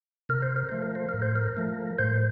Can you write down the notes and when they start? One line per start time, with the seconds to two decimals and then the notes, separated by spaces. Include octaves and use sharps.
0.29 C3 A#4
0.42 C5
0.56 A#4
0.69 F3 A3 C5
0.83 A#4
0.95 C5
1.09 A2 A#4
1.22 C5
1.36 A#4
1.57 F3 A3
1.98 A2 C5